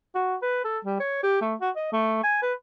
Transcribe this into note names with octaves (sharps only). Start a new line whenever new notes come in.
F#4
B4
A4
G3
C#5
G4
A3
F#4
D#5
A3
G#5
B4